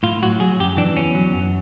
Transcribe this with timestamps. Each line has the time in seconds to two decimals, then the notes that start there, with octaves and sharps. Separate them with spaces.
0.03 A2 F4
0.22 F#3 F#4
0.40 F#3 G#4
0.60 F#2 G4
0.77 E3 D4
0.97 E2 C#4
1.15 F#3
1.33 F#2